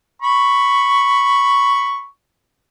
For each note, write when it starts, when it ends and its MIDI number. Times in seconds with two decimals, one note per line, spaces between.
0.22 2.06 83
0.22 2.06 85